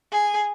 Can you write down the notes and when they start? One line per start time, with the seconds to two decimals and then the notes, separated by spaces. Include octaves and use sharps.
0.12 G#4